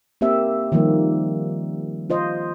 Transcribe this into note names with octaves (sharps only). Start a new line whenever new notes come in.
A#3 C4 G4 E5
D#3 F3 G3 A#3
F4 C5 D#5